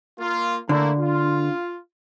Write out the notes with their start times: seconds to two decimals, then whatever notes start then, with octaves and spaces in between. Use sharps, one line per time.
0.19 A#3 F4
0.69 D3 A3 A#3 E4
0.99 F4